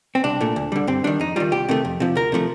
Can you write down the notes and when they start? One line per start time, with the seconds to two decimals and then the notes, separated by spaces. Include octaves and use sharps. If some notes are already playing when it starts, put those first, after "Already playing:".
0.15 C4
0.24 C2 D4
0.41 A#2 A3
0.56 D2
0.72 D3 G3
0.87 G2 C4
1.04 D#3 G3 D4
1.20 F2 D#4
1.36 D#3 G3 F4
1.52 C2 G4
1.69 C3 D#3 A3
1.85 F2
2.00 C3 F3
2.15 D2 A#4
2.32 C3 F3 A3